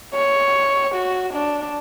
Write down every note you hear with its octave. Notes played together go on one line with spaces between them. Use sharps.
C#5
F#4
D4